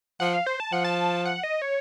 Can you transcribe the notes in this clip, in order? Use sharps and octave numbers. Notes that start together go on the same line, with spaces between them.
F3 F#5
F5
C5
A5
F3 F#5
A5
F#5
D#5
C#5